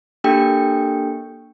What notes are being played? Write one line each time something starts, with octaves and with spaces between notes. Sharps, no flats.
A#3 D4 G4 A4 G5